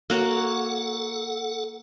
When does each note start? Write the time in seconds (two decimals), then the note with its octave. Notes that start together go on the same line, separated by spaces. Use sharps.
0.10 A#3 F#4 A4 C#5 F#5